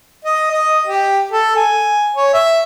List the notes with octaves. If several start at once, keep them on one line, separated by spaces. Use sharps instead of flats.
D#5
D#5
G4
A4
G#5
C#5
E5